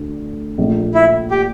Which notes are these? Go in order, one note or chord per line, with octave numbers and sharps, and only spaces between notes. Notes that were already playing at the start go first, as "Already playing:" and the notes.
Already playing: D2 D3
A#1 A#2 A3
E4
G4